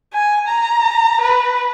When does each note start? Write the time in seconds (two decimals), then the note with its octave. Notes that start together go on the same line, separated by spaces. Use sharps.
0.13 G#5
0.47 A#5
1.21 B4